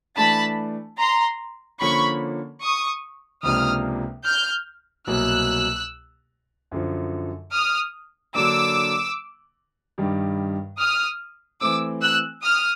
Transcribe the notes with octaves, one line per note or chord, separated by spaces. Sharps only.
E3 A3 D4 A5 B5
A#5 C6
D3 F3 A#3 C#4 B5 C#6
C#6 D#6
C#2 C3 F3 A#3 D4 D#6 F6
F6 G6
C2 B2 F#3 A#3 E6 F#6
F#2 D3 F3
D#6 F6
D3 F#3 A#3 D4 D6 E6
G2 D#3 G3
D#6 F6
E3 A3 C4 D6 E6
E6 F#6
D#6 F6